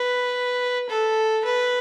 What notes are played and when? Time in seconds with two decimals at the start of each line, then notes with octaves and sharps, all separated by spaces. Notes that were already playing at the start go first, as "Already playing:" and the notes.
Already playing: B4
0.89 A4
1.45 B4